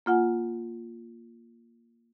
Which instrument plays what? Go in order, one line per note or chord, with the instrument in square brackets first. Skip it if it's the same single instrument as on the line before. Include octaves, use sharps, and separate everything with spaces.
[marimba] A#3 F4 F#5 G#5